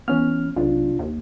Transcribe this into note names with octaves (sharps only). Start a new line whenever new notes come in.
E3 B3 C#4 F6
B1 C3 D4 F4
D#2